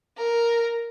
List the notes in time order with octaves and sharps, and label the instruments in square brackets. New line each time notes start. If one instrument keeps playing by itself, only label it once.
[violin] A#4